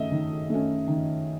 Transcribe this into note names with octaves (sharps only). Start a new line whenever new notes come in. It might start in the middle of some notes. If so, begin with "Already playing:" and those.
Already playing: D#3 A3 C#4 D#5 E5
D#3
A3 C#4
D#3